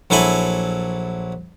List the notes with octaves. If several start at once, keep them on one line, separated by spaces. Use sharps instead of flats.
A#1 F#3 E4 A4 G#5 B5